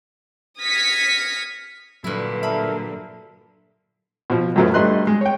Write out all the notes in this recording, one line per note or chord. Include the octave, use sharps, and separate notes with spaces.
D#6 F6 G#6 A#6 B6 C#7
G2 A#2 D3 F#3 E4
A4 A#4 E5 B5
B2 F3
F#2 F3 F#3 A3 B3
G2 G3 A3 D#5 C6 F#6
G#3
C#5 G5